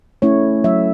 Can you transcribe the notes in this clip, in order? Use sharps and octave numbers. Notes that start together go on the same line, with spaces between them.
A3 C#4 E4 C#5
F#3 E5